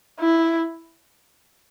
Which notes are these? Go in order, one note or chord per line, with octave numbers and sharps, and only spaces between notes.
E4